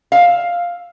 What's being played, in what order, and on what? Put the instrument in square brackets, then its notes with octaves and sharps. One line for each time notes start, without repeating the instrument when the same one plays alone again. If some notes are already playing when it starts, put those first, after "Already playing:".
[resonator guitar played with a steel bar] E5 F5